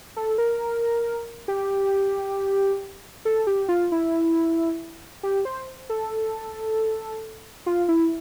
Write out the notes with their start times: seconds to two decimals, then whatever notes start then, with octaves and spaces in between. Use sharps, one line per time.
0.16 A4
0.38 A#4
1.48 G4
3.25 A4
3.47 G4
3.69 F4
3.92 E4
5.23 G4
5.45 C5
5.90 A4
7.66 F4
7.88 E4